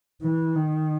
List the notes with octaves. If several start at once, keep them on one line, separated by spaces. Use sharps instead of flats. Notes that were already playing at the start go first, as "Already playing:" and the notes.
E3
D#3